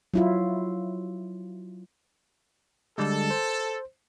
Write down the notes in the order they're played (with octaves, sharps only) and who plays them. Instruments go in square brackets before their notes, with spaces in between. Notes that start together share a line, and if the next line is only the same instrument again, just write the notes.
[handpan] F#3 E4 F4
[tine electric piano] D3 G3 G#3 [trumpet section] A4
[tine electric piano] C5